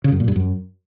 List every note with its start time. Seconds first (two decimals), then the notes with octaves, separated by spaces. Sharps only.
0.04 C#3
0.12 F#2
0.20 A#2
0.28 G2
0.36 F#2